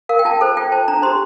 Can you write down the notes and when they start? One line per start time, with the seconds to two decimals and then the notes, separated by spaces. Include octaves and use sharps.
0.09 A#4 F5
0.19 G5
0.25 F4 A5
0.41 A4 C5
0.57 F4 G5
0.72 C5 A5
0.88 D4 A#5
1.02 G4 C5 C6